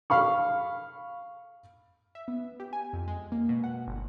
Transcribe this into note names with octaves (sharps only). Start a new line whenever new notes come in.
F5 B5 C#6
E5
B3
G4
G#5
F2
G#3
A#3
B2
F#5
G1